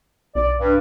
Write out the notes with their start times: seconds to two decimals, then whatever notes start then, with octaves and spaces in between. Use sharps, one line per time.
0.35 B1 D5
0.59 G2